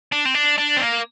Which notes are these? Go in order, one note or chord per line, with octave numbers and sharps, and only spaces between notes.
D4
C4
D4
D4
C4
A#3